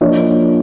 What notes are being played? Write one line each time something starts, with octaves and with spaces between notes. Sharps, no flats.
F3 A#3 D4 C#5 D#5